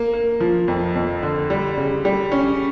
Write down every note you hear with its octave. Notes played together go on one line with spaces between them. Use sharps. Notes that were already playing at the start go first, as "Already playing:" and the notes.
Already playing: A#3
A#3
F3
F2
F2
D3
G3
C#3
G3
C#4